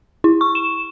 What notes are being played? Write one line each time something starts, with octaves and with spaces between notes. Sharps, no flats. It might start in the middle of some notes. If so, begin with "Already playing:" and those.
E4
C#6
E7